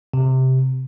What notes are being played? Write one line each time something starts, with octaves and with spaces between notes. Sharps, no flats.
C3